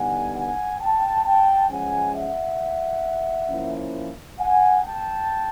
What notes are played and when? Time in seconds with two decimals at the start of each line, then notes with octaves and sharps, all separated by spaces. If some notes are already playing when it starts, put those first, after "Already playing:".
Already playing: D3 G3 B3 D#4 F#5 G#5
0.35 F#5 G#5
0.79 G5 A5
1.25 G5 A5
1.69 F3 G#3 C#4 F#5 G#5
2.15 E5 F#5
3.49 F3 A#3 C#4 E4
4.39 F#5 G#5
4.83 G5 A5